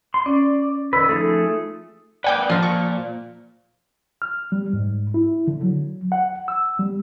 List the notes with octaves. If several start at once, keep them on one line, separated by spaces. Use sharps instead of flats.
C6
C#4 D5
D#3 B4 E6
F3 A3 D#4 G#4 A4
A#3 B4 D5 F#5 G5 D6
A#2 F3 F4 A#5
C#6
F6
G3
G#2
E4
D3
F#3
F#5
E6
G3